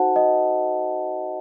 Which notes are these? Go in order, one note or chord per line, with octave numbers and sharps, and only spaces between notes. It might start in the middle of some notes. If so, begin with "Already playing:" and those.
Already playing: D#4 F#4 A4 C5 F#5 A5
D#5